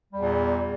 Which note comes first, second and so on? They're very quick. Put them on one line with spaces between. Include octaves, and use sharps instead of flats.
G3 E2 A#2